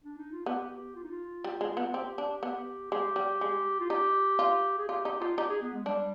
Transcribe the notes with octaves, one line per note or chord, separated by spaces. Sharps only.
D4
D#4
F4
B3 G4
G4
F4
D#4
F4
G3
G#3
B3
C4 G4
D4
B3
G#3 G4
G3
G#3
F4
D#4 G4
F4
G#4
F4 G4
D#4 G4
D#4 F4
D#4 G4
G#4
B3
G#3
G3 D4